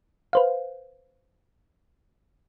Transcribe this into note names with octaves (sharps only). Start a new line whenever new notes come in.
B4 C5 F5